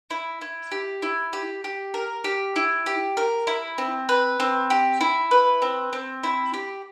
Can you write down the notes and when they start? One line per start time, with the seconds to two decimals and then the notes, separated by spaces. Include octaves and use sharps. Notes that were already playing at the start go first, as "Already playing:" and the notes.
0.11 E4
0.41 E4
0.72 G4
1.02 E4
1.33 G4
1.64 G4
1.94 A#4
2.24 G4
2.56 E4
2.86 G4
3.17 A#4
3.47 E4
3.78 C4
4.09 B4
4.40 C4
4.70 G4
5.01 E4
5.31 B4
5.62 C4
5.93 C4
6.23 E4
6.54 G4